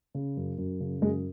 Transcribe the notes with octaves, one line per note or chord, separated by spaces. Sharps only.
C#3
F#2
F#2
C#3
F#2 G#3